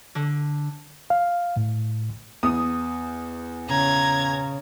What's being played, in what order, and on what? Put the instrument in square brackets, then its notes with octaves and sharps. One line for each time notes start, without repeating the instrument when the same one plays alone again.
[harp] D3
[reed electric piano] F5
A2
[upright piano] E2 [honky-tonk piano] D#6
[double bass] C#3 [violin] A#5 G#6